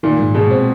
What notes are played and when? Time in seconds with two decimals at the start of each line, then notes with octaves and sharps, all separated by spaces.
0.03 A#2 D#3
0.19 G#2
0.34 B2 G#3
0.50 C4